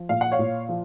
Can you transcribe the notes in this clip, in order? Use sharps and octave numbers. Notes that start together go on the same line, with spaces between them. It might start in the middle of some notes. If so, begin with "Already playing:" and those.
Already playing: F3
A#2 F5
F#5
C#5 F5
A#2
F3